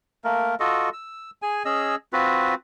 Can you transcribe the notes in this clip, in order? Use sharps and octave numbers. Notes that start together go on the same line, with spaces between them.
A3 A#3 A#4
F4 F#4 A4 D#5
E6
G#4 G#5
C#4 G#4 D#5 E6
C4 F4 F#4 B4